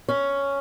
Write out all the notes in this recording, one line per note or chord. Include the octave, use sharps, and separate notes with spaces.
C#4